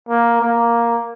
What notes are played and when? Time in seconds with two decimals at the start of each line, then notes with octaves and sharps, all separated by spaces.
0.09 A#3
0.42 A#3